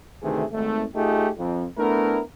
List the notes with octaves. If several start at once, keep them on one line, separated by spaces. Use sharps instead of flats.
D2 C3 D#3 E3 A3 G#4
G#1 A3
A3 D#4 F4 G4 G#4
F2
A3 B3 D4 E4 A#4